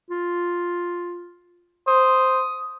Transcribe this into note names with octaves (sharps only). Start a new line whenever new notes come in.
F4
C5 D#6